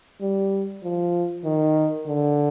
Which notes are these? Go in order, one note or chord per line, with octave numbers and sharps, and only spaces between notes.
G3
F3
D#3
D3